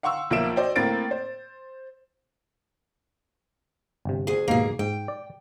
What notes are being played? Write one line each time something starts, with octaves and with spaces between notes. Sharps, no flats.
F5 F#5 C6 C#6 E6
B1 F3 A#3 E5 D7 E7
F#4 C5 D5 D#5 G5
A2 A#3 C4 A6 D7
C5
G1 C3
D2 G#4
D#2 G#2 B2 A#3 G#4
G#2 G5
D5